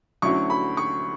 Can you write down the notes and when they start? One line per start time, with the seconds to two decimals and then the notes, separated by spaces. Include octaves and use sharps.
0.22 D2 D3 F#3 C#4 E4 C#6
0.50 B5
0.77 C#6